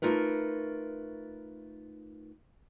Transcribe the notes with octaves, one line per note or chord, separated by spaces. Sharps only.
A3 D#4 F4 A#4 B4